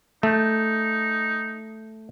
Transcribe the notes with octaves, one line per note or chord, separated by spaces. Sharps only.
A3 D#4